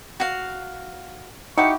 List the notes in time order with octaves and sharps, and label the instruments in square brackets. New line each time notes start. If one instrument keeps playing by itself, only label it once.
[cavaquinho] F#4 F5
[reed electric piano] D#4 [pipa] E4 F#4 G4 [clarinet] C#6